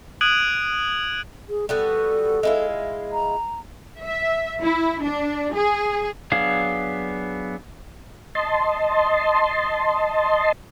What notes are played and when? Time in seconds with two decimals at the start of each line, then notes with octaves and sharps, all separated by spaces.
0.21 D#6 F#6 G#6 D7 D#7 F#7
1.49 G#4
1.69 G3 B3 F#4 A4
2.43 G#3 E4 F4
3.13 A#5
4.03 E5
4.62 E4
5.03 D4
5.54 G#4
6.32 F#3 B3 D4 G#4 F5
8.35 D#5 A5 C6